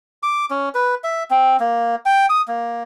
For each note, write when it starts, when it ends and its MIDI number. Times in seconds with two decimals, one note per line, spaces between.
0.23 0.46 86
0.50 0.69 61
0.75 0.95 71
1.04 1.23 76
1.31 1.57 60
1.60 1.95 58
2.06 2.26 79
2.29 2.42 87
2.48 2.83 58